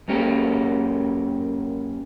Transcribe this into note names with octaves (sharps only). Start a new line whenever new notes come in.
F#2 A#3 C#4 G4